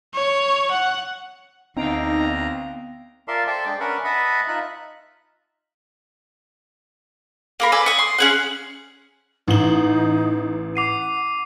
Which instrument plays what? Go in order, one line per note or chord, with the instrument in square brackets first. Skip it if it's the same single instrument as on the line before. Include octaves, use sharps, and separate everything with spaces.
[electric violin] C#5
F#5
[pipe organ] D2 A#5 [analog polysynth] B3 F5 G5 [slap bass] C4 [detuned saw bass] D#4
[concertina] F4 A#4 D5 E5 A5 C6
A4 C5 D5 E5 G5 A5
G#3 D4 D5 G5
C#4 D4 A#4 B4 E5 F#5
B4 D#5 E5 F#5 A5 B5
D#4 F4 E5 F#6
[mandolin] A#3 A#4 B5
A4 B4 D5 G#5
C#6 D#6
C6
C#4 G#4 F#5
[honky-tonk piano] A1 F#7 [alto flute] D#4
[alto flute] F#5 [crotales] D6 C7 D#7